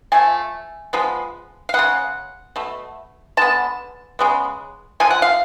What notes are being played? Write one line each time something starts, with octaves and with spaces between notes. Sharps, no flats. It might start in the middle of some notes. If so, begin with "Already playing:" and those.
F3 A3 G#5
F3 G#3 B3
F5
C#3 G#3 B3 F#5
B2 A3
D3 G#3 B3 A5
C#3 G#3 B3
D3 F3 G#3 G#5
F#5
F5